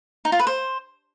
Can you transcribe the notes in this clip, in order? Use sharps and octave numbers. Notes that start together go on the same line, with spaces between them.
D#4
F4
B4
C5